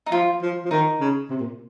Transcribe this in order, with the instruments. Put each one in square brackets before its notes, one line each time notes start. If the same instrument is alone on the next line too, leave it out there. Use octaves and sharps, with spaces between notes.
[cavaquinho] D#4
[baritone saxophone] F3 [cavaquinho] F4
[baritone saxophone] F3
F3
[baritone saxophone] D#3 [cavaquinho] D#4
[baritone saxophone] C#3
C3
A#2